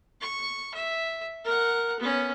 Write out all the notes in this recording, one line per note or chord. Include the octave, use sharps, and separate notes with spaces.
C#6
E5
A#4 F#5
B3 C#4